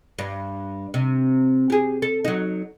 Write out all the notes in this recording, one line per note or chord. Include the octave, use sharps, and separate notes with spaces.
G2
C3
G4 G#4
A4
F#3 D#4